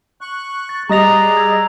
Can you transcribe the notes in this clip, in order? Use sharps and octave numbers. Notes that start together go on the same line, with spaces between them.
C#6 F#6
A6
G3 G#4 D5 D#5 A#5 A#6 F7
F#6
E6 G#6